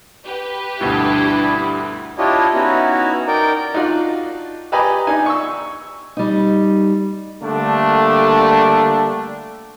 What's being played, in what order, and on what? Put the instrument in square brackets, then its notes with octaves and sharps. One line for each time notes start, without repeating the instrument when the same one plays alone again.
[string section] G4 B4
[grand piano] D2 G2 B2 [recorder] D4 [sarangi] E4
[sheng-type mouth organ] D4 E4 F4 G4 C#5 D#5
B3 C#4 D#4 E4 F#4
D#4 A#4 D5 G5
[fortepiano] D4 D#4 F4 F#4 D5
G4 B4 D5 D#5 G#5 A#5
D4 D#4 G#5
C#6 E6
[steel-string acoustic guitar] G3 D#4
[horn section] D3 G3 A3 A#3 D4